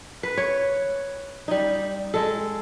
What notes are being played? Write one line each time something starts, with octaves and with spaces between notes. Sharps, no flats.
B4
C#5
G3 D#4
G#3 A4